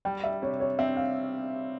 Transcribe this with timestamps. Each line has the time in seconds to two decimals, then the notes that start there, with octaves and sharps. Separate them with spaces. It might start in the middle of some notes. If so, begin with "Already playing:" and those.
0.05 G3 G5
0.24 E5
0.42 C3 C#5
0.60 C#5
0.79 C4 E5
0.97 F5